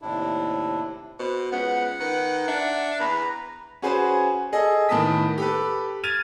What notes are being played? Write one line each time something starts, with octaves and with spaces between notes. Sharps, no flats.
D#2 A2 C3 D4 E4
B2 C5
C#2 B3 F#5
D#3 B4
D4 E5
E2 B4 A#5
C#4 F#4 G#4 B4 C5
G#4 A4 D#5
A2 D#3 B3 A5 D#6 B6
G4 A4 B4
F6 G#6 A6 D#7 F7